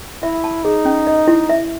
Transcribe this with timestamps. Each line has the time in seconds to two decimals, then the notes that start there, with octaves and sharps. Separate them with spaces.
0.22 E4 E5
0.44 A5
0.64 D#4 G#4
0.85 C#4
1.07 D#5
1.28 E4
1.49 E5